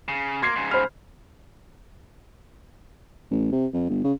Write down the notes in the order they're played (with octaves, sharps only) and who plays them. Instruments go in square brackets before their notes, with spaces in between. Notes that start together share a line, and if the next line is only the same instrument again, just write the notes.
[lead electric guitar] C#3
[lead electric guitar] A#3 [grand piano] C6 G#6 C7
[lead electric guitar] G#2 C#3
[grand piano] C5 B5 F6
[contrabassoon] A1
C3
F2
G1
C#3